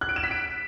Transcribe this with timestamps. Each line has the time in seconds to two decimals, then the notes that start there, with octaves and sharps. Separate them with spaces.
0.01 F#6
0.09 D7
0.16 E7
0.24 B6
0.31 D7